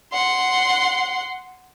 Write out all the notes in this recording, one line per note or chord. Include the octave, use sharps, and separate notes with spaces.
F#5 C6